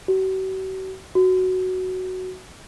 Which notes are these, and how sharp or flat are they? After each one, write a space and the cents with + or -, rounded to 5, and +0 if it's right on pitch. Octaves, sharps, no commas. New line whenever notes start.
F#4 +45
F#4 +5